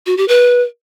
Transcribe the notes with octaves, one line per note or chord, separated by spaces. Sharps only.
F#4
G4
B4